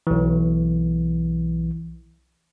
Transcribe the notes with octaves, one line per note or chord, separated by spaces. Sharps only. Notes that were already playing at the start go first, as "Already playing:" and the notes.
B1 E3